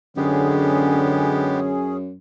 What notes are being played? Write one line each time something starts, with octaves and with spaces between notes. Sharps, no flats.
F#2 D3 G#3 B3 C#4 G4 G#4